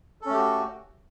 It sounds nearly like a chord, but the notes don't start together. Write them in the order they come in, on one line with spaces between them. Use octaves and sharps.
A4 C#4 A3 G4 F#4